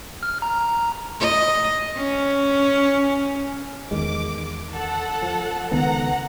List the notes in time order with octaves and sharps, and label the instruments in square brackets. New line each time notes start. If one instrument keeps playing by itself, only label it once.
[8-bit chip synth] F6
A#5
[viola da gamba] D#5
C#4
[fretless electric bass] E2 D#3 G#3 [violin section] D6
[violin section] A4 F#5
[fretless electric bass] F3
[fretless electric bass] C#2 D#3 B3 [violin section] F#5 A#5